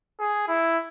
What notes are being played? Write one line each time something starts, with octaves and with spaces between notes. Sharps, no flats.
G#4
E4